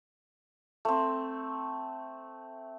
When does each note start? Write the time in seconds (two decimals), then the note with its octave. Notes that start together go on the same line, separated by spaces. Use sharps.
0.85 A3 C4